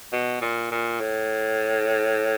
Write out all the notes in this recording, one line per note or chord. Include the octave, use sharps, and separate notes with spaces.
B2
A#2
A#2
A2